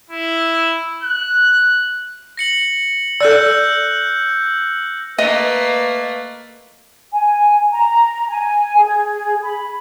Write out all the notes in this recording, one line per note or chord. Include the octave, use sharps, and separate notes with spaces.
E4
F#6
A#6 C#7 F#7
A4 D5 E6 F#6 G6
A3 A#3 B4 D#5 D#6
G#5
A#5
G#5
G#4
B5